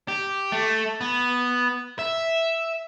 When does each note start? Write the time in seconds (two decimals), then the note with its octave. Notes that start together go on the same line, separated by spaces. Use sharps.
0.08 G4
0.52 A3
1.01 B3
1.99 E5